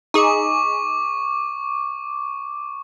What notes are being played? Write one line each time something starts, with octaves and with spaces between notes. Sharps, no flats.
D#4 G#4 C#6 D6